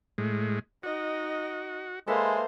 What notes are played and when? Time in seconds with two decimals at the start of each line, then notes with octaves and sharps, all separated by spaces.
0.18 A2 G#3
0.83 D#4 F#4 D#5
2.08 G#3 A#3 A4 B4 C5 E5